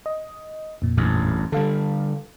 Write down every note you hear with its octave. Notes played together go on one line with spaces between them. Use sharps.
D#5
F2 A#2
A1 G2
D3 G3 A4 F5